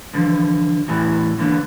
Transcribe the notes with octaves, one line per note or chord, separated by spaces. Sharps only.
D3 E3 F3
E2 A2 E3 G#5
D3 E3 A#3 B3